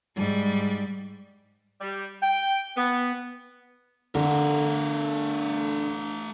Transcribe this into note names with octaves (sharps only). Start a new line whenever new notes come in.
G#2 G3
G3
G5
B3
D3 A3 A#4